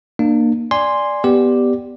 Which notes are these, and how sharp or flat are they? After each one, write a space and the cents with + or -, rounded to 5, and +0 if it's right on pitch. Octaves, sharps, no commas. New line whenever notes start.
A#3 +0 D4 +35
D5 +0 G#5 -10 C6 +0
B3 +0 G4 +0 D5 +0